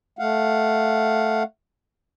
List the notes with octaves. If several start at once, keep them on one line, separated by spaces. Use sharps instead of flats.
A3 F5 F#5